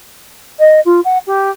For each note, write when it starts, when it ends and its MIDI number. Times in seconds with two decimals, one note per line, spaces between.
0.59 0.80 75
0.85 1.00 65
1.04 1.18 78
1.26 1.50 67